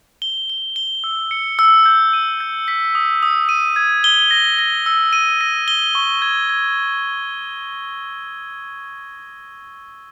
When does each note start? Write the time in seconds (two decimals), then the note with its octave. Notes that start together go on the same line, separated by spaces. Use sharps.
0.22 G7
0.50 G7
0.76 G7
1.04 E6
1.31 C#7
1.59 E6
1.86 G6
2.13 D#7
2.40 G6
2.68 B6
2.95 D#6
3.23 D#6
3.49 D#7
3.76 G#6
4.04 G7
4.31 A#6
4.59 A#6
4.86 E6
5.13 D#7
5.41 A#6
5.68 G7
5.95 C#6
6.22 G#6
6.50 G#6